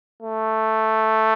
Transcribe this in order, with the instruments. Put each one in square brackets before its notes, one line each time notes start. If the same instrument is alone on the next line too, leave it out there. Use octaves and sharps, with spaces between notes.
[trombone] A3